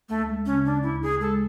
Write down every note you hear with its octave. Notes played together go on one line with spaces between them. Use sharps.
D2 A3
G#3
C#3 C#4
G#3 D4
D2 E4
D2 G#4
G#3 A4